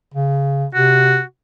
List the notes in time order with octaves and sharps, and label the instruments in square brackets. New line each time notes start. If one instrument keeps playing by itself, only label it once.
[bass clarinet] C#3
[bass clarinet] C3 [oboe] F#4